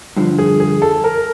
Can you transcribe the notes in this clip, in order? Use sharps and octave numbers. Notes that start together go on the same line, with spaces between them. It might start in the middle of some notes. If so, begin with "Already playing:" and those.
G2 D3 F3
G#4
G#4
A4
A#4